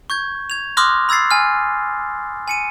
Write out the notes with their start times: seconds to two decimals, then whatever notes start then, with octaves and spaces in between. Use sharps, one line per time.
0.10 C#6 G6 G#6
0.50 G#6 F7
0.77 C6 D6 D#6 F6 F#6 A#6
1.09 B5 E6 G#6 A6 C7
1.31 G#5 F6
2.48 G#5 C#7 D#7